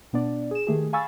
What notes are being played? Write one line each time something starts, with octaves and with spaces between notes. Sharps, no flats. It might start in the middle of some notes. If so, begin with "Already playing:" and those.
B2 B3 D4 D5
G#4 E7
D#3 A3 G4 G#4
F5 G#5 B5 C#6 E6 A6